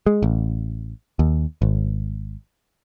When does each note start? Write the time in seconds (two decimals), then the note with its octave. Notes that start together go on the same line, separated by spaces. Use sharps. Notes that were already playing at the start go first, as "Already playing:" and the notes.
0.06 G#3
0.23 A1
1.19 D#2
1.62 G#1